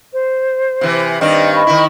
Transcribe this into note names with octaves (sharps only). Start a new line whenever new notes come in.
C5
C3 E3
G2 D#3 C4 D5 D#5
D#5 B5 C#6
D#3 E4